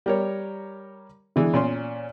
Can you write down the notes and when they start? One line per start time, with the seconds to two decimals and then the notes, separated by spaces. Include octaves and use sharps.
0.06 G3 A#4 C#5
1.36 D3 E3 G#3
1.54 A#2 C#4 C6